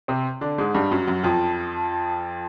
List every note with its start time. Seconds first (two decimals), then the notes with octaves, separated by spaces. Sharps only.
0.08 C3 C4
0.41 D3 D4
0.58 G#2 G#3
0.74 G2 G3
0.91 F#2 F#3
1.07 F#2 F#3
1.23 F2 F3